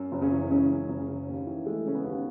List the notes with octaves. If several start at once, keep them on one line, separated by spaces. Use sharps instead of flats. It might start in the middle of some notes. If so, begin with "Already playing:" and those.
Already playing: F#2
F#1
C#3 C#4
E3
C#3 G#3 C#4
F#2
F#1
C#3
D#2
E3
G#3 A3
C#3 C#4
B3
D#2